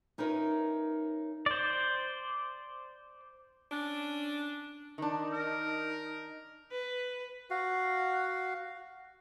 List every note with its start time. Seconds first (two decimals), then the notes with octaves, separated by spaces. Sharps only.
0.18 C#4 D#4 E4 A#4 B4
1.46 C5 D5
3.71 C#4 D4
4.98 D#3 D4 D#4
5.33 A#4
6.71 B4
7.50 F#4 F5